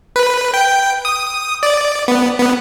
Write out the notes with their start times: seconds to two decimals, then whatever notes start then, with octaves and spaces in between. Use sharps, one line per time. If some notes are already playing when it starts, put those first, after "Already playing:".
0.16 B4
0.54 G5
1.05 D#6
1.63 D5
2.08 B3
2.39 B3